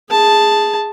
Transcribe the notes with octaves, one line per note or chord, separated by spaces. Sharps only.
G#4 A5